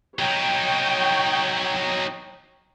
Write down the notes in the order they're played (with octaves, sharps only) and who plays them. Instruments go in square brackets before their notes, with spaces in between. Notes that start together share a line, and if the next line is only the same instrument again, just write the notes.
[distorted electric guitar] F#3 D#4 [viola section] C#5 G5